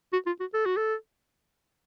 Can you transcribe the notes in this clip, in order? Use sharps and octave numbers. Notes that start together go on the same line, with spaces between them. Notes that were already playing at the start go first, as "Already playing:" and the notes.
F#4
F4
F#4
A4
F#4
A4